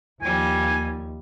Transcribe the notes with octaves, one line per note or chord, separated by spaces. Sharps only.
D#2 F3 G3 G#5